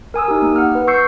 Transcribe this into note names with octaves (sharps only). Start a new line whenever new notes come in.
A#4 G#5 D#6 E6
D#4 G4
A#3
F#5 F6
B4
C#6 E6 G6 C7 C#7